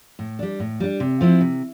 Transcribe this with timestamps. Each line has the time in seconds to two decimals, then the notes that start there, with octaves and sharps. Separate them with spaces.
0.19 A2
0.39 G3 D4
0.60 A2
0.80 G3 D4
1.00 C3
1.21 F3 C4 E4
1.41 C3